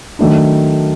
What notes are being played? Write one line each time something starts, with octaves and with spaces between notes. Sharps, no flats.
D#3 F#3 A3 D4